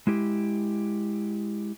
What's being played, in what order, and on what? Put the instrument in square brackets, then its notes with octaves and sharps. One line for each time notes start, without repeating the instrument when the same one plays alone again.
[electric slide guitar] G#3 E4 G4